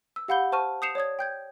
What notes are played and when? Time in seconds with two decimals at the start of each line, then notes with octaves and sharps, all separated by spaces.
0.16 E6
0.28 G4 F5 F#5 B5 G6 G7
0.52 C5 A5 C#6 F6 D#7
0.82 D#6 G6 C7 C#7 E7 F7
0.95 C#5 D5 D#6 G#6
1.19 G5 G6 G#6